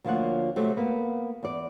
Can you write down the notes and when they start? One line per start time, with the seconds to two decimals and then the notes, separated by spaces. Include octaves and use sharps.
0.04 D2 F3 A#3 F4 C#5 F#5
0.56 C3 F#3 A3
0.77 A#3 B3
1.43 E2 D5